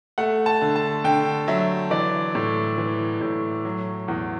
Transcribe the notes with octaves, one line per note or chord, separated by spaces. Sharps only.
A3 F#5
A5
D3
A5
D3 G5
F#3 E5
E3 D5
A2
E3
A2
F#3
E2